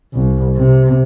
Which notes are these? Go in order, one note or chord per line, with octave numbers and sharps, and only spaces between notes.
C2
C3